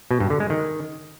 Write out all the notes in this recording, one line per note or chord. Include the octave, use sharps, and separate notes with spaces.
B2
G2
D3
G#3
D#3